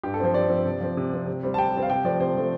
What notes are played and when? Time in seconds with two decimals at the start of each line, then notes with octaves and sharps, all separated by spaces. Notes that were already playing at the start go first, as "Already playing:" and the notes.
0.03 G2 G4
0.14 A4
0.20 F3 C4 C5
0.34 G2 D5
0.50 F3 C4
0.65 C3
0.81 F3 C4
0.97 C3
1.12 F3 C4
1.27 C3
1.43 G3 C4
1.54 A5
1.58 C3 G5
1.73 G3 C4
1.83 F5
1.89 C3 G5
2.04 F3 A3 C4 D5
2.20 C3 C5
2.35 F3 A3 C4